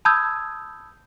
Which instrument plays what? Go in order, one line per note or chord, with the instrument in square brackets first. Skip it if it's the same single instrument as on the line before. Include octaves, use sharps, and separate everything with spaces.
[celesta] A5 B5 D#6 E6 G6 G#6